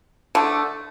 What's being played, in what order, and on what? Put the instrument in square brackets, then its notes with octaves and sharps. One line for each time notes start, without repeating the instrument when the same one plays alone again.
[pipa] D3 A3